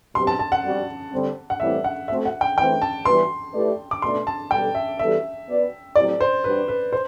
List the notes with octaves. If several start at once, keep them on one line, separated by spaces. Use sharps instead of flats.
B2 F#3 C4 G4 C6
A5
A5
F#5
G3 C4 F#4
D3 G3 C4
F#5
A2 E3 G3 C4 E4 E5
F#5
A3 C4 F#4 A4 C5 E5
F#5
G5
E3 A3 C4 G5
A5
E3 G3 B3 F#4 B4 C6
A3 E4 G4 B4 D5
D6
B2 A3 D4 A4 D5 C6
A5
B2 G3 D4 A4 G5
E5
E3 G3 B3 F#4 A4 E5
B3 F#4 B4 D5
A2 F#3 C4 E4 G4 D5
C5
G3 D4 F#4 B4 C5
B4
C5